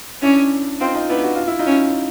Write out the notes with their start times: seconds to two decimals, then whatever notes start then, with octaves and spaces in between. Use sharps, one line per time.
0.22 C#4 D4 E4
0.81 C4 D#4 F4
0.95 D#4 F4
1.09 B3 D4 E4
1.24 F#4
1.35 F4
1.48 E4
1.59 D#4 F4
1.67 C#4